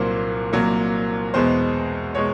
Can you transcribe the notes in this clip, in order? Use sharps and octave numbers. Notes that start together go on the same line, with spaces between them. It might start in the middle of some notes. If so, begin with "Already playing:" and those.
Already playing: C2 A#2 F#3 A#3 C5
C2 A#2 F#3 A#3
E2 B2 G#3 B3 C5
B2 G#3 C#5